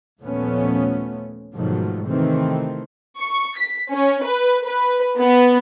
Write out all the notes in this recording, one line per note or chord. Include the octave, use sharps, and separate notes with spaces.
D#2 A#2 F3 A3 B3 C#4
G#2 B2 D#3 F3 F#3 A3
C3 D#3 E3 A3 C4
C#6
B6
C#4
B4
B4
B3